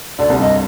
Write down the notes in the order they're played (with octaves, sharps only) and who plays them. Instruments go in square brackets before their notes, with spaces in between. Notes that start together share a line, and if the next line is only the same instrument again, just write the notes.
[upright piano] D2 D3 [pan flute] D5
[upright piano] C2 C3
[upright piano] G2 [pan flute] D#5